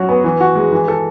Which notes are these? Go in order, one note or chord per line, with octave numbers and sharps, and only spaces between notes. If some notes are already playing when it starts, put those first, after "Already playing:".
Already playing: F#3 C#4 F#4
B3
E3
F#4
G#3
E3
A4